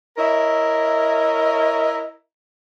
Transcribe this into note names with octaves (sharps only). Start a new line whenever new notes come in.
E4 A#4 C#5 D#5 E5